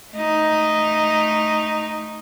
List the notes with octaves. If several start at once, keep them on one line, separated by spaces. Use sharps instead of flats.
A3 D#4